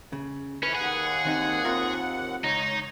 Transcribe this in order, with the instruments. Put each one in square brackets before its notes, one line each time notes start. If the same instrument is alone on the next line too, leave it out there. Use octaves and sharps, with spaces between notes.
[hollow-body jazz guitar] C#3
[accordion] F2 E3 [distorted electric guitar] C#4 [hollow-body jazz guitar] B4
[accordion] D#2 F#5 [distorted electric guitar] G#4
[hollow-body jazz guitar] D#3 C4 D#4
C4 F4 A#4
[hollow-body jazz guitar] C#2 [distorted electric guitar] D#4 [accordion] C#5